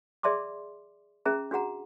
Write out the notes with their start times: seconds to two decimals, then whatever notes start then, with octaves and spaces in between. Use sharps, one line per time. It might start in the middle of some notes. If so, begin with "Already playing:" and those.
0.23 G#4 D5 E5 A5 C6 D6
1.26 C#4 G#4 E5 A5 A#5
1.51 D4 F#4 G#4 F#5 A#5